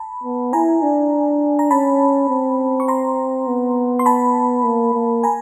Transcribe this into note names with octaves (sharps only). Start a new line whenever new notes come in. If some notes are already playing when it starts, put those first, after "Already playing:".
Already playing: A5 B5
B3
E4 G#5 A#5
D4
A#5
C#4 A5 B5
C4
C#6
A#5 C6
B3
C6
A5 B5
A#3
A#3
G#5 A#5